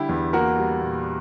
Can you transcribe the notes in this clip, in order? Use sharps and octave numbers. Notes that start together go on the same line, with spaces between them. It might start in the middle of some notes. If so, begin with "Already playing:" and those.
Already playing: D3 G3 E4 G4
E2
A#3 F#4 A#4
G3
A#2